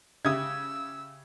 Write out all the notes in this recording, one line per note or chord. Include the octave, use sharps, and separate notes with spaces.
C#3 G4 E5 D#6 E6 G#6